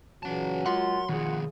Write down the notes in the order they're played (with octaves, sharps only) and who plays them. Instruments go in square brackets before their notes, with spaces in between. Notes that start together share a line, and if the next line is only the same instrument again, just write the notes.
[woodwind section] A#2 C#3 E3 [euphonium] F#3 [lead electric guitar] C#4 A5
[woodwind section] G#3 F4 [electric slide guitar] A#4 F#5 [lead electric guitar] C6
[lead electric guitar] B2 F3 [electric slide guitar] D#3 G#4 [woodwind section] F4 F#5